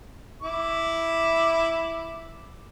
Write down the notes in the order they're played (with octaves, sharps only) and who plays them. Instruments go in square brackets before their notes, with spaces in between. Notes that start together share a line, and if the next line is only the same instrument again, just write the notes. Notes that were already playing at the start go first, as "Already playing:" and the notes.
[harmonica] E4 D6